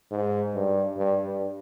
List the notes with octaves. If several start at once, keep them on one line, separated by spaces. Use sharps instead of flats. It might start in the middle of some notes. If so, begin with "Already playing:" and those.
G#2
G2
G2
G2